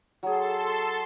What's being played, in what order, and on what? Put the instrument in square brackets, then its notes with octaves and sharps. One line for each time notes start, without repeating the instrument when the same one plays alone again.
[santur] F#3 G#4 [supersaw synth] A4 A5 C6